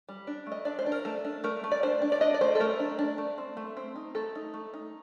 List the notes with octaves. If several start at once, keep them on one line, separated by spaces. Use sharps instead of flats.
G3
D4
A3
D#5
D4 D5
C5
D4
A#4
A3 A4
D4
A3 A#4
A3
D5
D4 C5
D4
D5
D4 D#5
D5
A3 C5
A4
A3 A#4
D4
D4
A3
C4
A3
C4
D#4
A3 A4
D#4
A3
D#4